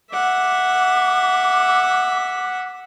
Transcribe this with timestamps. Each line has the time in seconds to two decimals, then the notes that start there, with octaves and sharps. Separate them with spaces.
0.12 E5 F#5 D6